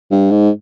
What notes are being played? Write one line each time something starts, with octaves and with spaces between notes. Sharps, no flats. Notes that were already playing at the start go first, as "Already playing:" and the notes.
G2
G#2